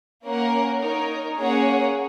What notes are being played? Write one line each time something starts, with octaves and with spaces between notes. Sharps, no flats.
A#3 C#4 A#4 F#5
D#4 A#4 C#5
A#3 C#4 G#4 C#5 F#5